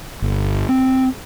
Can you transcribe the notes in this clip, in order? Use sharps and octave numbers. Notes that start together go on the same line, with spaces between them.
G1
C4